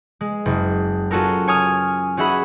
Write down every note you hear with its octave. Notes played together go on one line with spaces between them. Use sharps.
G#3
F#1
C#4 F4 F#4 A4 A#4
C#5 G#5 D#6 F6
C#4 F#4 G#4 E5 F#5 B5